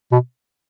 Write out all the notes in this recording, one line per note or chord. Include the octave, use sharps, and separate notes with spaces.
B2